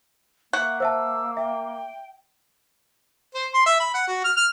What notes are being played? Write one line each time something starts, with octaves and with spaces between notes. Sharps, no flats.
A#3 E5 F#5 C#6
C5 E5 A5 E6
E5 G5
C5
C6
E5
B5
F#5
F#4
F6
F6